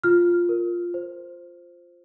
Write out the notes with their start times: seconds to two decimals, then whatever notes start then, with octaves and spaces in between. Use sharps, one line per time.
0.03 F4 F6
0.49 A#4
0.94 C5